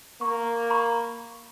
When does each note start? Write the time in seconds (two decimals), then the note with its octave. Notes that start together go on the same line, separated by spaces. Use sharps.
0.21 A#3 C#6
0.70 A#5 B5 C#6